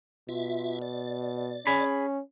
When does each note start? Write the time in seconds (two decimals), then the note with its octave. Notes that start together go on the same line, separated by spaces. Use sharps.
0.29 B2 F4 E5
0.82 D5
1.67 C#4 G#4 B5